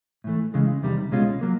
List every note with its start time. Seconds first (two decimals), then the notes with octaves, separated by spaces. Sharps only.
0.24 A2 E3 A3
0.54 C#3 E3 G#3
0.82 E2 C3 D#3 G3
1.11 C2 B2 G#3 C#4 F4
1.41 F#3 A#3